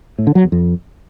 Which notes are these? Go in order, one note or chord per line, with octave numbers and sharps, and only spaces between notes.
A2
D3
F#3
E2
F2